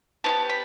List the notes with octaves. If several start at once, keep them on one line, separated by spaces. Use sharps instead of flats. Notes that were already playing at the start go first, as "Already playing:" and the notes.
B3 E4 G4 A5
B5